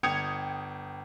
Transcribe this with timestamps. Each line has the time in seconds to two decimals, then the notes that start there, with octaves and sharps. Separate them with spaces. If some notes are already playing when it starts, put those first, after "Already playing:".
0.03 G1 G5 D#6 G#6 C#7 F7